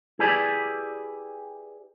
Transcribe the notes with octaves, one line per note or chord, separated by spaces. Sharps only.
E4 G4 G#4 B4 D5